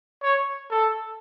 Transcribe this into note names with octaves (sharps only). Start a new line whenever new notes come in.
C#5
A4